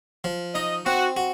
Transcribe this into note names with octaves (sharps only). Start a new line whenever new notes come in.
F3
D#4 D#5
C4 F#4
F#4